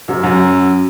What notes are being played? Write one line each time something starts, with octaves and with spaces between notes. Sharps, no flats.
F#2 F#3
F#2 F#3